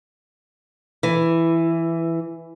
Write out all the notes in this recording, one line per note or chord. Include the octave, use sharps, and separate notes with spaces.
E3